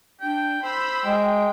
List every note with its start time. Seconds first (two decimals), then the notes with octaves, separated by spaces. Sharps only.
0.21 D4 G5
0.63 C5 B5 E6
1.05 G#3 G5